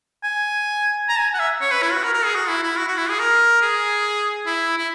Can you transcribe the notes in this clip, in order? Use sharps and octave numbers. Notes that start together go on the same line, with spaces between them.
G#5
A#5
G#5
F#5
E5
C#5
B4
E4
F#4
A#4
A#4
G#4
F#4
E4
E4
F#4
F#4
E4
G#4
A#4
G#4
E4
E4